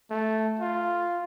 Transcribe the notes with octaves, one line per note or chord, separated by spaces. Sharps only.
A3
F4